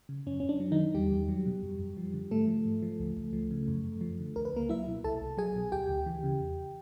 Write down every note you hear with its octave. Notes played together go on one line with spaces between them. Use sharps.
C#3
F#2 C#4
F#2 C#4
D4
F#3
D#3 D#4
D3
E2 G3 G4
E2
F#3
B2
F#2
F#2
F3
D3
G#2 A3 A4
F3
G#2
F3
C#2
C#2
F3
C#3
F#2
F#2
F3
D3
C#2 A#4
B4
C#2 A#3 A#4
F#3 E4 E5
B2
C2 A4 A5
C2
F#3 G#4 G#5
B2
D2 G4 G5
D2
E3
C#3
E2